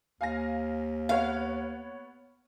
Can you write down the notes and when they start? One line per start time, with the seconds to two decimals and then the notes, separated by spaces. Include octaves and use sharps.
0.21 D#2 F5 G#5 A#6
1.09 B3 C#5 F5 F#5